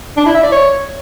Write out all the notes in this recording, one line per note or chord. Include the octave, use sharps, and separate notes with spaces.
D4
E4
E5
D5
C#5